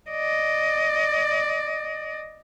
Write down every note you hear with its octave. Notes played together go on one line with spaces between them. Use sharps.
D5 D#5